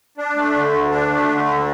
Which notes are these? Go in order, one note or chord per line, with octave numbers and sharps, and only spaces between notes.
D4
A3
D3
D2
D4
A3
D3
D2